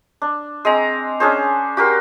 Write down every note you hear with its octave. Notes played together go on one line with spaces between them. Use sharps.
D4
G#3 C4 A#5
C#4 D4 G#4 C5
F#4 G4 A#4 C6